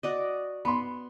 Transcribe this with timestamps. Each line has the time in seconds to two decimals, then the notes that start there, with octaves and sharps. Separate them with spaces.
0.03 F#4 D5 D#5
0.65 B3 B5 C6